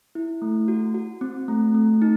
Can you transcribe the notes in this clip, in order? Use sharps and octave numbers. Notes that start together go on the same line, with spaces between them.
E4
A3
F#4
F#4
C4
A3
A3
D#4